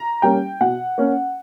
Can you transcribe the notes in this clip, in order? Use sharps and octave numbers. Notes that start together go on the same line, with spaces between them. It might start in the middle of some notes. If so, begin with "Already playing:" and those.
Already playing: A#5
G3 A#3 C#4 G5
B2 F#5
A#3 C#4